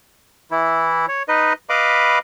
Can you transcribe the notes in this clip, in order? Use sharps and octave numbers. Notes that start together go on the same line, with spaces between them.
E3 E4
C#5
D#4 B4 D#5
B4 D#5 F5 B5 D6